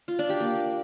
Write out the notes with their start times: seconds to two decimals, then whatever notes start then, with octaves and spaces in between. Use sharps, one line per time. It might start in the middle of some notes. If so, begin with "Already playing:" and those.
0.08 F4
0.19 D4
0.30 G4
0.40 A#3